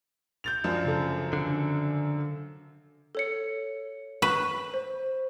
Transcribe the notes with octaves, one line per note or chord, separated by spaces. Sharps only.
G6 A6 F7
F#2 F3 D4
C#3 A4
D3
A4 C#5 C#7
B4 C#6
C5